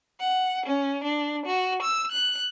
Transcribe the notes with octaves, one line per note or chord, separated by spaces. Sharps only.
F#5
C#4
D4
F#4
E6
F#6